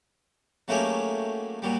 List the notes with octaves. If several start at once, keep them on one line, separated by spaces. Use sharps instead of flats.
F#3 A3 A#3 C#4 G4 G#4
A#2 F#3 G3